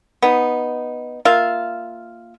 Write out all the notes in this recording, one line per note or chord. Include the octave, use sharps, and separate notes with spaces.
B3 D#4
A#3 F4 E5 F5